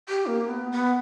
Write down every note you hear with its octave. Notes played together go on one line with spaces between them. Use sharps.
G4
A#3
B3
B3